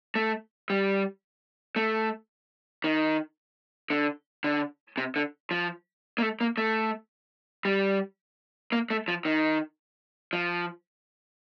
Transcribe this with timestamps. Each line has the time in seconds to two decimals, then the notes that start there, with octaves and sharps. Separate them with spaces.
0.15 A3
0.70 G3
1.76 A3
2.84 D#3
3.90 D3
4.44 D3
4.98 C3
5.16 D3
5.51 F3
6.18 A#3
6.22 A3
6.41 A#3
6.58 A3
7.65 G3
8.72 A#3
8.90 A3
9.08 F3
9.25 D#3
10.33 F3